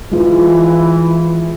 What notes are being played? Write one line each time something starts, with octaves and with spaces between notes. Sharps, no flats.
E3 G#3 F4